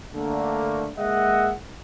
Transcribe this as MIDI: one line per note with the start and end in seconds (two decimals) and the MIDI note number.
0.14 0.89 50
0.14 0.89 57
0.14 0.89 58
0.97 1.51 56
0.97 1.51 58
0.97 1.51 75
0.97 1.51 76
0.97 1.51 78